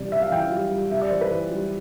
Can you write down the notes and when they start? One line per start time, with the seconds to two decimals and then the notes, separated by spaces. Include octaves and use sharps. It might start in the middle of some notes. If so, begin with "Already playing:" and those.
Already playing: C3 E3 G3 D5
0.12 C3 E5
0.22 F5
0.32 E3 G5
0.42 F5
0.52 G3
0.71 G3
0.91 C3 E5
1.02 D5
1.11 E3 C5
1.21 B4
1.31 E3
1.51 G3